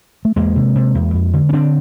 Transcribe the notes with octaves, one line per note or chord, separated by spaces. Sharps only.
A3
E2 G#3 A#3
C3
C3
E2
F2
D3
C#4
D3 C4 D4